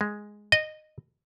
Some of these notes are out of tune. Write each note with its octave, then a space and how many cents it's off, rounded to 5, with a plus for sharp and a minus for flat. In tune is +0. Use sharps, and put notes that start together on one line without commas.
G#3 +0
D#5 -15